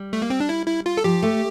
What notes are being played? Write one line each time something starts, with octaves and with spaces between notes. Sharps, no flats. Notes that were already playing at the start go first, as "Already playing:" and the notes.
Already playing: G3
A3
A#3
C4
D4
E4
E4
F4
A4
F3 G4
A3